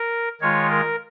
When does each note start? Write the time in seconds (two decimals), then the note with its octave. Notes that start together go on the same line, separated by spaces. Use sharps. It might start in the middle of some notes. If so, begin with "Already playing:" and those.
Already playing: A#4
0.41 D#3 G#3 F4 C#5
0.70 A#4